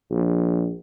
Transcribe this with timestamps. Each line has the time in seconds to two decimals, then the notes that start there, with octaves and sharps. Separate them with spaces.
0.11 A#1